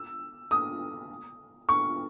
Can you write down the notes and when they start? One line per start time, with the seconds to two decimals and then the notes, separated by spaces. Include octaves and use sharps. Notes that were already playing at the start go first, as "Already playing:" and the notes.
Already playing: E6
0.51 D#6
1.69 C#6